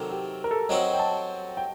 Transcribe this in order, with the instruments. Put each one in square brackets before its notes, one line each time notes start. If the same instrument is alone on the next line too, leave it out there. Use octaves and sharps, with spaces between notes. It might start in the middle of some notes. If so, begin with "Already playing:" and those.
Already playing: [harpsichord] C3 D#3 F#3 [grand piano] A4 A#4
[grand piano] G4
A#4
A4
[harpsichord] F#3 C4 F#4 [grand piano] D#5
[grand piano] G5
A5
G5